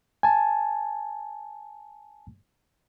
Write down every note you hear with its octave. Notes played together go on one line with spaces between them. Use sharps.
G#5 A5